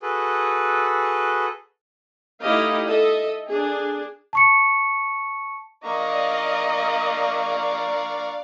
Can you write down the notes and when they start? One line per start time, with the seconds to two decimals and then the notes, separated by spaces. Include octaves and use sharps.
0.02 F#4 G#4 A4 B4
2.41 A3 D#4 E4 G4 D#5 F5
2.87 A4 D#5 E5
3.47 D4 G#4
4.33 A5 C#6 C#7
5.84 A#3 D4 D5 D#5 F5 A#5 C#6